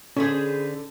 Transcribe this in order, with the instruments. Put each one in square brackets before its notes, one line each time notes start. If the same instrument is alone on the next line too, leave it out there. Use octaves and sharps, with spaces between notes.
[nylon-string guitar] D3 [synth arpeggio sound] C#4 [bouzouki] G#4 B4 C5